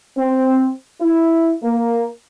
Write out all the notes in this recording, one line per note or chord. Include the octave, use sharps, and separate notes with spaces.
C4
E4
A#3